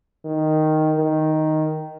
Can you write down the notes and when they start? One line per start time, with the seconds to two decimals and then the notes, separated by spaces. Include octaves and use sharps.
0.25 D#3
0.98 D#3